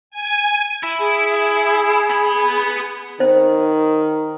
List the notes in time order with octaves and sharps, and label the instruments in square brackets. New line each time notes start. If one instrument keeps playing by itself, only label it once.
[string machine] G#5
[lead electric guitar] E4
[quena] G#4
[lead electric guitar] B3 B5
[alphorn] D#3 [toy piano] C5